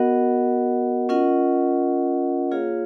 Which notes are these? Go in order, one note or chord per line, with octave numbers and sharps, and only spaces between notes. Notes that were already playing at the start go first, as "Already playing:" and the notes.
Already playing: B3 F#4 A#4 D#5 F#5
C#4 F4 A#4 D#5 F#5
A#3 F4 G#4 C#5 F5